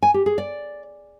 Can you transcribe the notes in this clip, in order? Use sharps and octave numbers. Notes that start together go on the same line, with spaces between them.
G#5
G4
G#4
D5